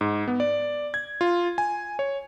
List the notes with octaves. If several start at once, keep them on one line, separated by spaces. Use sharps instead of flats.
G#2
B3
D5
G#6
F4
G#5
C#5